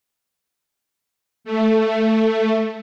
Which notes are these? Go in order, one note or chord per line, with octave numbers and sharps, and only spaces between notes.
A3